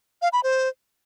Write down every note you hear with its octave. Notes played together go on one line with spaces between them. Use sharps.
F5
B5
C5